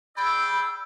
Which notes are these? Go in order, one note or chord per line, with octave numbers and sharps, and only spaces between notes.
G#4 D5 G5 B5 E6